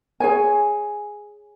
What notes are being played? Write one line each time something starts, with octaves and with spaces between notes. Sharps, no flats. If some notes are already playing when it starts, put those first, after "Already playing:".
G#4 C#5 G#5